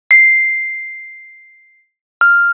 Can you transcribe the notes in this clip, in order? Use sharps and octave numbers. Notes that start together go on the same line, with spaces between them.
C7
F6